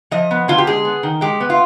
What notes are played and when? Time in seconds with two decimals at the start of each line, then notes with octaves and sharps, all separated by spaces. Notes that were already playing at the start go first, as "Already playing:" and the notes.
0.11 F3 D#5
0.31 B3
0.48 D3 F4
0.58 G4
0.67 G#3 G#4
0.85 B3
1.03 D#3
1.21 G#3 G4
1.40 B3
1.50 F4